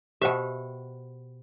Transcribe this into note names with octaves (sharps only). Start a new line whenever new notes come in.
B2 G4 C5 E5 G5